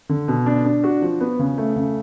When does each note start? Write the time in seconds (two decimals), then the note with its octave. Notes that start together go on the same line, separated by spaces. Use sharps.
0.09 D3
0.28 B2
0.46 D4
0.65 D4
0.84 F#4
1.02 F3
1.21 B3
1.39 C#3
1.58 A3
1.76 C#3